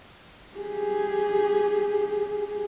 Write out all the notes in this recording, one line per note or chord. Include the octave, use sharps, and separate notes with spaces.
G4 G#4